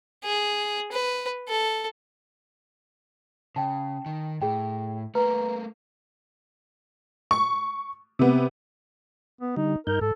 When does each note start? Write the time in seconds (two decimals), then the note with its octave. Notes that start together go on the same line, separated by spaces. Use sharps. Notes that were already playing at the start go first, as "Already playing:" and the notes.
0.24 G#4
0.92 B4
1.48 A4
3.56 C#3 G5 A5
4.06 D#3
4.42 A2 G#4 G5
5.15 A3 A#3 B4 A#5
7.31 C#6
8.19 C3 B3
9.41 B3
9.57 D3 G3 D#4
9.87 G2 D#4 A#4 G6
10.01 G#2 A4